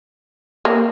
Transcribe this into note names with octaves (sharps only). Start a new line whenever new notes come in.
A#3